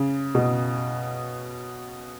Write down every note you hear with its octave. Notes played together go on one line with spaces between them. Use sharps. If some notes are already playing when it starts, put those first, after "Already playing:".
Already playing: C#3
B2